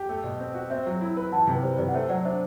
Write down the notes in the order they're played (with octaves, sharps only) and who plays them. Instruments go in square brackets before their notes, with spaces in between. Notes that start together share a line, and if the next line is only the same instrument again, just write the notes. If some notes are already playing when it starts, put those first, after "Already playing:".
Already playing: [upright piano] G4
A3
B2
C4
F#4
[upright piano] C4 [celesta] C5 E5
[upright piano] F#3
E4
B4
[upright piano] E3 [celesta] F#5 A5
[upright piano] C3
[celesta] B4
[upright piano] G3 [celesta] C5
[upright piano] C3 [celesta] B4 D5
[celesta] F#5
[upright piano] A3 [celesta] C5 E5
[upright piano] F#3 [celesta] D5 F#5
[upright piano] D4 [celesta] C5 E5